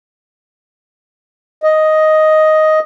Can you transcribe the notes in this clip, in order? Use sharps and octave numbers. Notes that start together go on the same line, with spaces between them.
D#5